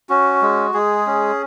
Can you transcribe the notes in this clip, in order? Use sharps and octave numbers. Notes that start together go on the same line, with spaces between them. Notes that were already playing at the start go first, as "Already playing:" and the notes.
C#4 F#4
G#3
G#3 G#4
C#4